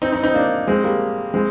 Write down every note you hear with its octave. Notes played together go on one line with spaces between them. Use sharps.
C4 D#4
C4 D#4
C4 D#4
A#3 D4
G#3 C4
G3 A#3
G#3 C4